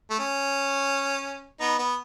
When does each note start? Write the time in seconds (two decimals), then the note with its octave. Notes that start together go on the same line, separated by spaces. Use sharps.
0.10 A3
0.19 C#4
1.60 B3 D#4
1.79 B3